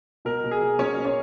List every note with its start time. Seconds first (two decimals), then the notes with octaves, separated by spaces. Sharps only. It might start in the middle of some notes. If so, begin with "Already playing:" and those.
0.25 B2 A#4
0.44 B2
0.51 G#4
0.61 B2
0.79 B2 C#4 C#5
0.96 B2
1.05 C#4 C#5